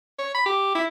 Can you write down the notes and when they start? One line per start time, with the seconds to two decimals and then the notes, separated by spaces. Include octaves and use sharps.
0.19 C#5
0.35 B5
0.46 G4
0.75 E4